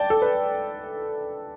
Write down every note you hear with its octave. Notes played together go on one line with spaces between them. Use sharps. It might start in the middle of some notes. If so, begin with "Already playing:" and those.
Already playing: D5 G5 A5
A4
B4